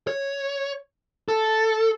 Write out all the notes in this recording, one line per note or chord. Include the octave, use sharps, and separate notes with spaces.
C#5
A4